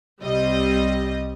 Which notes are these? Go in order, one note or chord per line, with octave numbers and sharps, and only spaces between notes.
C2 G3 C4 D#5